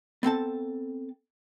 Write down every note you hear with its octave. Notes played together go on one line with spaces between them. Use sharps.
B3 C4 A4 A5